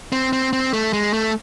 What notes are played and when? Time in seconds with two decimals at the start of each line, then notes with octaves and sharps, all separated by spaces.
0.12 C4
0.33 C4
0.53 C4
0.73 A3
0.93 G#3
1.13 A3